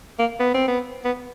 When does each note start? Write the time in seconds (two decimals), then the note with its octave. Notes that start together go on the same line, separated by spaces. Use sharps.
0.19 A#3
0.40 B3
0.54 C4
0.68 B3
1.04 B3